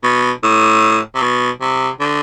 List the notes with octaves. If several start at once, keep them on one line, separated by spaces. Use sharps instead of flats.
B2
A2
C3
B2
C3
D3